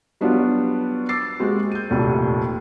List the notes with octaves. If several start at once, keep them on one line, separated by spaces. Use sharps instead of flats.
F#3 G3 B3 D4 F4 F#4
D6 E6 A6 C7
G#3 A#3 C4 F#4 G4
G6 D#7
F1 D#2 A#2 A4